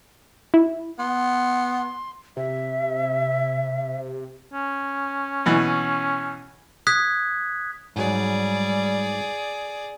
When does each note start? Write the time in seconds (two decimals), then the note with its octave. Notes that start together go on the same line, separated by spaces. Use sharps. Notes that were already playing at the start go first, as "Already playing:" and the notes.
0.54 E4
0.99 B3 C6
2.37 C3 E5
4.53 C#4
5.46 B2 E3
6.87 D#6 F#6 G#6 B6
7.96 G#2 F#3 G3 G#4 D5